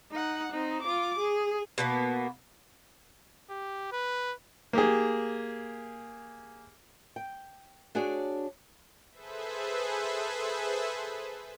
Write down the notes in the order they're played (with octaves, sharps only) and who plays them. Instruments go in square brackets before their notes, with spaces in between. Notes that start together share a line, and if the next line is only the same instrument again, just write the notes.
[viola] D#4 F#5
C4 D#4
F4 D6
G#4
[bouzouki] B2 A#3 B3
[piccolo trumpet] G4
B4
[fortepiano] A#3 G4 G#4
[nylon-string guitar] G5
D4 F#4 G#4 C#5 D5
[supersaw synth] G#4 A4 B4 C5 E5